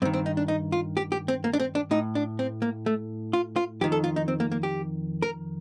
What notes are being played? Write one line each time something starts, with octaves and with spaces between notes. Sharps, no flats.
G2 D#3 C4
C4
D#4
D4
D#4
F4
G4
G4
C4
A#3
D4
C4
D4
A2 D#4
D4
C4
A#3
A3
F4
F4
F2 D#3 G4
A4
F4
D#4
C4
A#3
A#3
G4
A#4